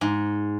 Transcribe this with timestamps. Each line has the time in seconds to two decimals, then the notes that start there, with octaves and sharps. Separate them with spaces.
0.01 G#2